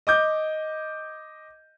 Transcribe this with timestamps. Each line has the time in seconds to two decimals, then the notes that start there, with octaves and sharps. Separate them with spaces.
0.07 D#5 D6 G6